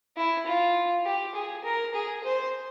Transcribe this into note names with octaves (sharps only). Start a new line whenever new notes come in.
E4
F4
G4
G#4
A#4
G#4
C5